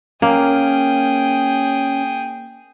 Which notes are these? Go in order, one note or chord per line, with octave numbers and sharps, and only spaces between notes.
A#3 C#4 G#4 G5